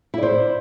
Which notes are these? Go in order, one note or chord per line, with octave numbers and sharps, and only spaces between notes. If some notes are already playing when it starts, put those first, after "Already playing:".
E4 C5 D5